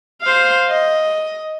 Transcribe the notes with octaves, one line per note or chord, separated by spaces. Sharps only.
C5 F5
D#5